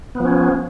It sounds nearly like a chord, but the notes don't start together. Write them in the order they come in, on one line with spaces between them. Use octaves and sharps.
B3 F3 C#4